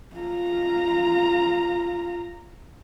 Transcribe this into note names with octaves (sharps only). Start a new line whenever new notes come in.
F4 A#5